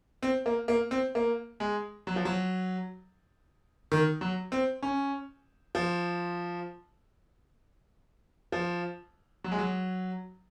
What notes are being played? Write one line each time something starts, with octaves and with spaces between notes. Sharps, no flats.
C4
A#3
A#3
C4
A#3
G#3
F#3
F3
F#3
D#3
F#3
C4
C#4
F3
F3
F#3
G#3
F#3